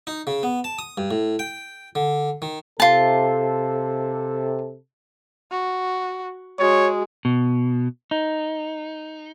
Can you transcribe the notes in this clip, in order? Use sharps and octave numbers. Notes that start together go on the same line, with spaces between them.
D#4
C#3
B3
A5
D#6
G2
A2
G5
D3
D#3
C3 F4 A4 A5
F#4
G#3 F#4 C#5
B2
D#4